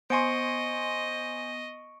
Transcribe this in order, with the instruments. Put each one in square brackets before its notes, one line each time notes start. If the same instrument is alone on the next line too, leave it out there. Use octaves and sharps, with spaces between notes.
[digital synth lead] B3 [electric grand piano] C5 G#5 C6 [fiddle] D#5 [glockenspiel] C#6 C#7 D7